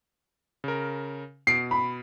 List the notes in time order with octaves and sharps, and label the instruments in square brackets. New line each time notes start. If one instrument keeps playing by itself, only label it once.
[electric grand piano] C#3 A#4
[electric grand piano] B2 D7 [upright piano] C7
[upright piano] B5